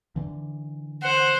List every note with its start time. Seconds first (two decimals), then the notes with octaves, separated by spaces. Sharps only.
0.16 D3 E3
1.03 C5 F#5